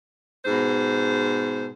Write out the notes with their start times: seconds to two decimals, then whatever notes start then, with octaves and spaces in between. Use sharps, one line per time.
0.45 G#2 B2 C5